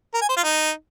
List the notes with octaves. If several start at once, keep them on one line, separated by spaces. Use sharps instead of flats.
A#4
G#5
C5
F4
D#4